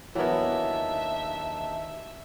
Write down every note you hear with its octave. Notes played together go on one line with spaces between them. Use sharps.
D#2 E3 F#3 B3 D4 D#4 A#4 E5